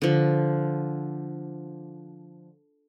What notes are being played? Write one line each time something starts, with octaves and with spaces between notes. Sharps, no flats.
D3 F3